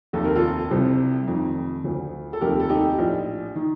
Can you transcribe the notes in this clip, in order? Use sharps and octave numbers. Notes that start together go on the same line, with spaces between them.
F1 D#2 D#3 A4
A#4
F4 A4
C2 C3 F3
F1 F2 D#3
D2 D3 F3
A4
F1 D#2 D#3 G4 A#4
A4
D#4 G4
A#1 A2 F3
D#3